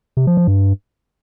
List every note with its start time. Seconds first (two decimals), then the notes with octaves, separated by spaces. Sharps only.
0.17 C3
0.27 F3
0.37 F3
0.47 G2